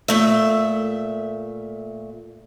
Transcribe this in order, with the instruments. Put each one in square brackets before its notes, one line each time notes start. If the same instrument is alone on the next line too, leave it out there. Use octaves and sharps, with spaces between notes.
[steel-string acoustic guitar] A#2 A3 E5